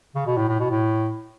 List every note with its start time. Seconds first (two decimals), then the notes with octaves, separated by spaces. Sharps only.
0.15 C#3
0.26 B2
0.37 A2
0.48 A2
0.60 B2
0.70 A2